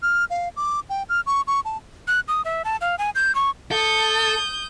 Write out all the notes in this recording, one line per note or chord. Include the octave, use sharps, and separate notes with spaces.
F6
F5
D6
G5
F6
C#6
C#6
A5
F#6
D#6
E5
A5
F5
G#5
G6
C#6
A4 D#6 G6